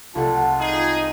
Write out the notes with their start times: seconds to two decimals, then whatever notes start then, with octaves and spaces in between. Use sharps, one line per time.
0.15 C2 A3 F4 F#5 A5
0.60 D#4 G#4